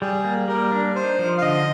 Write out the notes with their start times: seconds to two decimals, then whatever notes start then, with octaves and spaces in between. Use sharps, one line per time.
0.02 G3 G#4
0.24 A#3
0.48 G3 A#4
0.72 D4
0.95 D#4 C5
1.19 F3
1.38 F5
1.42 D3 D#5